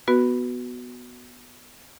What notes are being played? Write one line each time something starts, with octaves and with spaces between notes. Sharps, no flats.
B3 F#4 B4